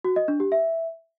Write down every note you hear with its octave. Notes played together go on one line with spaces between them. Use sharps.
F#4
D#5
D4
G4
E5